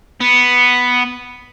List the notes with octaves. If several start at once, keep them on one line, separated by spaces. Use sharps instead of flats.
B3